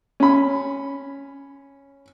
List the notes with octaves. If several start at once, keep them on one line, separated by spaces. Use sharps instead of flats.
C#4 B5